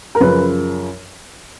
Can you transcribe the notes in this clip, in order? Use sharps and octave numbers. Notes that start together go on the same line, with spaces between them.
A#4
F#2 C#3 F3 B4